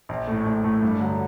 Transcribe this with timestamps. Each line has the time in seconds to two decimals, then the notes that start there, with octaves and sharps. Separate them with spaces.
0.09 A#1
0.27 A2 A3
0.46 A#1
0.64 A2 A3
0.82 G2
1.00 D3 F#3